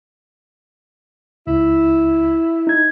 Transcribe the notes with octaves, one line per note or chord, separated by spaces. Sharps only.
C#2 E4
D#4 G#6